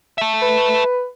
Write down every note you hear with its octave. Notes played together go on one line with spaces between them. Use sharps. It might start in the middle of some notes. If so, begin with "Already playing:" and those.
A4 E5
B4